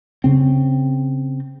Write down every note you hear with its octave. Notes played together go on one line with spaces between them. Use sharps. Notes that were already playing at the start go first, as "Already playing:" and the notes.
C#3 C4